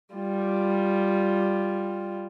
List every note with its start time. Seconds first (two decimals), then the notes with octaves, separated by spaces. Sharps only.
0.15 G3 F4